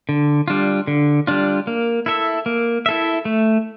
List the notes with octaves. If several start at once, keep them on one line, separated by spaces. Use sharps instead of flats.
D3
G3 D4 F4
D3
G3 D4 F4
A#3
E4 A4 E5
A#3
E4 A4 E5
A3